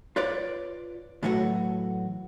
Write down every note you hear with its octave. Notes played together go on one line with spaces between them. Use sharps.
F4 B4 C#5 D5
A2 E3 F#3 A3 F#4